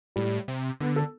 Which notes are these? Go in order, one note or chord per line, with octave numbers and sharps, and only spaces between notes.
A2 G3
C3
D3 B3
A4